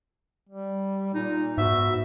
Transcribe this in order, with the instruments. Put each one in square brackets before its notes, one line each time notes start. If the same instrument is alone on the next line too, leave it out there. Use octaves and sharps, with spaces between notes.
[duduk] G3
[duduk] A#2 [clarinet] D#4
[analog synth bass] G#2 [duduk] B3 [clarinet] F#4 [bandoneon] E5